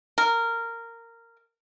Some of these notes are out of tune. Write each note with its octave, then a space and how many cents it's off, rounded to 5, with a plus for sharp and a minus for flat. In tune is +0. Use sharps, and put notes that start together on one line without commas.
A#4 -15